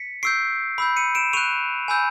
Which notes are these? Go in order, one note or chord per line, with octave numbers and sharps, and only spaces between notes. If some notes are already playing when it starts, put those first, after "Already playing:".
Already playing: B6 C#7
C#6 E6 G6 C7 D7
B5 E6 G6
C#7 D#7
D7 E7
C#6 F#6 D#7 F7
G#5 B5 E6 G6